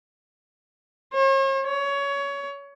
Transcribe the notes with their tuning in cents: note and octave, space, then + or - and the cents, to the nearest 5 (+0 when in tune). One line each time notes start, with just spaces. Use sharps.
C#5 -45
C#5 +20